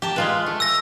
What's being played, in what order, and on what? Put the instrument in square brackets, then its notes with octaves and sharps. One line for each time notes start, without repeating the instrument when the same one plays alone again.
[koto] G4 A5 A#5
G#3 F4 B4
A3
[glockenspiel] E6 A#6